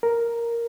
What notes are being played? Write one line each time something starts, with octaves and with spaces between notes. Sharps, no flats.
A#4